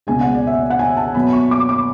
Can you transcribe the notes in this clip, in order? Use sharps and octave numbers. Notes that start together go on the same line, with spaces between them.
C#2 B2 G#3 G#5
F#5
D5
E5
F#5
G#5
A5
B2 F#3 B3 B5
C#6
D6
D6